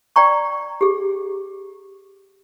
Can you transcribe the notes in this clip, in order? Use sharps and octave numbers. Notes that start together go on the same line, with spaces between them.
D5 G5 A#5 C#6
G4 G#4